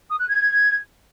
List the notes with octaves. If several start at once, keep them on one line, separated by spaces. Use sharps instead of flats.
D#6
F#6
G#6